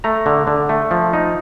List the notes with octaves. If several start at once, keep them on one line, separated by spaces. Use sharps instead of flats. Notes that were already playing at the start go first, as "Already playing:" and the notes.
A3 A#5
D3
D3
A3
F3
D#4